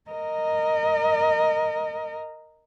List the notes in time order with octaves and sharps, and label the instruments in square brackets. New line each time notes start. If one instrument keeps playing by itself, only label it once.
[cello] A#4 D#5